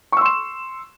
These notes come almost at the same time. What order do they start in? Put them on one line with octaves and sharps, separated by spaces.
C#6 E6 C6 E7